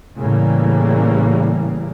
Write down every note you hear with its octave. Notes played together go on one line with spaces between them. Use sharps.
A2 C#3 E3 G3 A#3